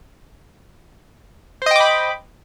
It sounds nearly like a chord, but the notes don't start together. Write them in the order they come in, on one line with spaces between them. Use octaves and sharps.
C5 D#5 G5 D6 B5